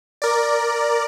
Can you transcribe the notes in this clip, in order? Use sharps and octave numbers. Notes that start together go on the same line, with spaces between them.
A#4 D5